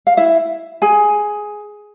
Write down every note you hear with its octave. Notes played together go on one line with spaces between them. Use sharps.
F5
E4 E5
G#4 G#5